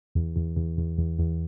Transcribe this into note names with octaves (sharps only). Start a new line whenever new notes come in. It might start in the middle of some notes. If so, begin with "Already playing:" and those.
E2
E2
E2
E2
E2
E2